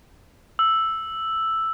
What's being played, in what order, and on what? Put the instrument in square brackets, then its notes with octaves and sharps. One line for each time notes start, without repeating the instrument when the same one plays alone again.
[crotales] E6